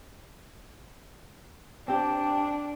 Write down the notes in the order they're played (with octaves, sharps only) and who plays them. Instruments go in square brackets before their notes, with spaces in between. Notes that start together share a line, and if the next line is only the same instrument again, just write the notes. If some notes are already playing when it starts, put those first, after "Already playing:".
[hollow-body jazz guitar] C4 G4 [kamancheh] D4